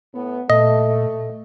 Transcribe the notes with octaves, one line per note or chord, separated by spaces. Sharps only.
A2 B3
A#2 A3 D#5